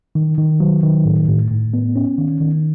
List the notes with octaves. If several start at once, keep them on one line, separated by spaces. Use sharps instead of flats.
D#3
D#3
F#3
D#3
A2
A2
A2
B3
C#4
D#3
D#3